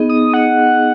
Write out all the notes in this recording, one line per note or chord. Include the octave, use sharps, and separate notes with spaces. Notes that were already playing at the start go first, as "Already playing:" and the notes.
Already playing: B3 D#4 G#4 D#5
D#6
B3 D#4 G#4 D#5 F#5